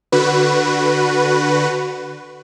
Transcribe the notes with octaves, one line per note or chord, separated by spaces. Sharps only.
D3 F#4 B4